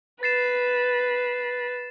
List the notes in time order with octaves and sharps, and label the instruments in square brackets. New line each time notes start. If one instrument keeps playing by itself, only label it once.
[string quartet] B4 [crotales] A6 C7 E7